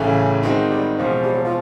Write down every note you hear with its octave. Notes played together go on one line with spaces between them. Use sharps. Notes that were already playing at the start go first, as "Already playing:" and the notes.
Already playing: A1 A2 C#3 E3 A3 C#4
D#3 G#3 C4 D#4 F#4
G3
E2 B2 F3 G#3
G3
F#3
F3